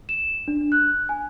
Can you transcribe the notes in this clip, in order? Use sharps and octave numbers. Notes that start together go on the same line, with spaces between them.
E7
D4
F#6
G#5